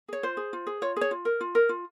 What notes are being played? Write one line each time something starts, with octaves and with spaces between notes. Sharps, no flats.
G#4 C#5
F4 C5
G#4
F4
G#4
F4 C#5
G#4 C#5
F4
A#4
F4
A#4
F4